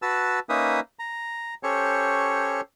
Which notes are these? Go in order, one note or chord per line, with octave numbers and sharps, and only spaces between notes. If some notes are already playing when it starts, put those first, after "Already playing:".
F#4 B4 A5 E6
A#3 C#4 D#4 B4 E5 D#6
A#5
C#4 G4 A4 C5 C#5 C#6